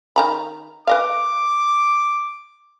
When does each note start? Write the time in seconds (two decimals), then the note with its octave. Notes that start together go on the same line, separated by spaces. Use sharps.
0.16 D#3 A#5 B5
0.87 B4 D#5 F5 D6